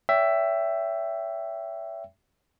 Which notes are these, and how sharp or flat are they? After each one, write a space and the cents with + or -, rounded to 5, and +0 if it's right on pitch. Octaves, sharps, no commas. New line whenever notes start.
C#5 +35 E5 +10 G5 +0